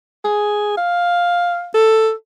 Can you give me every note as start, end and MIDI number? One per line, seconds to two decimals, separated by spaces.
0.24 0.77 68
0.77 1.69 77
1.74 2.12 69